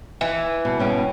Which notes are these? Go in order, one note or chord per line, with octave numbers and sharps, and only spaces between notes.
E3
B2
B2 C#4 G5